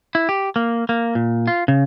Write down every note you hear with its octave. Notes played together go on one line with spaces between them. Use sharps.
E4
G4
A#3
A#3
A#2
F4
C#3